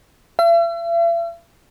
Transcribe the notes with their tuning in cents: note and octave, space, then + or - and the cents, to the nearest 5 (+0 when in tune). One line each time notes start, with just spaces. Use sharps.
E5 +45